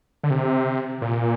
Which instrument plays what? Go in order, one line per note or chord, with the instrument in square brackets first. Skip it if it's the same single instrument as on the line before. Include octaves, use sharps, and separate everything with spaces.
[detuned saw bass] D3
C3
A#2